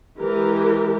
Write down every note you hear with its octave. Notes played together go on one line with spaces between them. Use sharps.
E3 G#3 G4 A#4